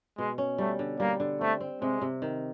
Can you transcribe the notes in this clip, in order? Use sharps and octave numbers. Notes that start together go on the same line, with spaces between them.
B2 G#3
C#4
G3 A3
D3
G3 A#3
D3
A3 C4
C4
C3 G#3
C3
D#3